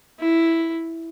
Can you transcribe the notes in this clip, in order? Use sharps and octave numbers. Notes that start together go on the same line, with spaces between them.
E4